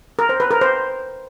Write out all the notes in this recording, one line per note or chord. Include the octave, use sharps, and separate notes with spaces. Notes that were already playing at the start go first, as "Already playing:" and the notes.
A#4
C5
B4
A#4
C5